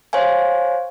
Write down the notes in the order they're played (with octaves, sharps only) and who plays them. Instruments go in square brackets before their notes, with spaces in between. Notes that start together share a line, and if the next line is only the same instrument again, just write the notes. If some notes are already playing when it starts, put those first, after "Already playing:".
[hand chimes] C5 C#5 F5 G#5